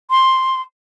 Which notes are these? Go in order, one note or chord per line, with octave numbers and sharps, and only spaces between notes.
C6